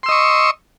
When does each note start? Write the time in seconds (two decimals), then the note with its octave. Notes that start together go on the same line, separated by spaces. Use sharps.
0.03 C6
0.06 E6
0.09 D#5
0.11 C#6